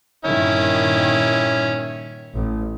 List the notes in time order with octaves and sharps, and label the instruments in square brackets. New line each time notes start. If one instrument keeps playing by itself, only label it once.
[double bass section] G2 A#2 D#3 [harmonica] C#4 E4
[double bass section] A1